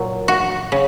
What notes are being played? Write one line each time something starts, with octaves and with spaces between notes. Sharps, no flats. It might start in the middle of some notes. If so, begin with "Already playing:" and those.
Already playing: A#2 F#3
F#4
C#3